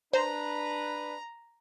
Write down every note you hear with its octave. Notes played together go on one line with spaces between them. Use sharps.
D4 B4 C5 A#5